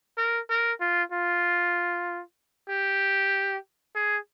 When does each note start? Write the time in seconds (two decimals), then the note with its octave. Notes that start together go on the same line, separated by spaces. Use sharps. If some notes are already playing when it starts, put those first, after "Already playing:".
0.17 A#4
0.50 A#4
0.81 F4
1.12 F4
2.69 G4
3.95 G#4